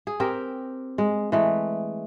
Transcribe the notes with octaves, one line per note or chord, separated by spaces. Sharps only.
G#4
C4 G4 A#4
G#3
E3 G#3 A3